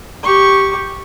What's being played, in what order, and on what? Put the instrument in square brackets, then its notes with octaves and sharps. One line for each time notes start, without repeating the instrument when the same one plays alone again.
[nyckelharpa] G4 C#6